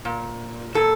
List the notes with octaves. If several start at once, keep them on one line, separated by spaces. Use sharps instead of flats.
A#2
A#2 A4